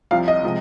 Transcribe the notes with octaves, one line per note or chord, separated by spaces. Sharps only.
C2 C3 F3 F5
D#5
C3 F3 G#3